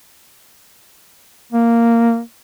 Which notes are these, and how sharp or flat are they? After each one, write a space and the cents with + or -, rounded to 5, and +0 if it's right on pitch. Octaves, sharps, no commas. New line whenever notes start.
A#3 -5